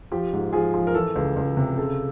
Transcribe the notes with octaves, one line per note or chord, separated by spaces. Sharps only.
F3 G4
G#2
F3 G#4
F3
A#4
E3 A4
C#2
C#2
C3
C#3 A4